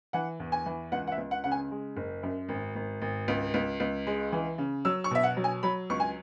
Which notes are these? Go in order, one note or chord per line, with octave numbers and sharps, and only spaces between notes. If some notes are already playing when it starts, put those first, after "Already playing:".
E3 F#5
E2
G#5
E3
C#2 F#5
F#5
E5
C#2
F#5
C#3 F#5
G#5
G#3
F#1
F#2
G#1
G#1
G#1
C#2
C#2
C#2
G#3
E3
C#3
F#3 E6
C#6
B2 E5
F#5
F#3
G#5
F#3 B5
C#2 C#6
G#5